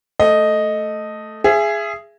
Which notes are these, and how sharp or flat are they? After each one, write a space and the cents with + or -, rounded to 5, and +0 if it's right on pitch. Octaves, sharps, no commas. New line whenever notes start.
A3 +0 D#5 +0
G#4 +0 E5 +30